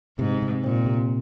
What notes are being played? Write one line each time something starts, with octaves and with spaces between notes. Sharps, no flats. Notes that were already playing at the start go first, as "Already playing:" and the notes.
G#2 C3
C3
A#2 C4
C3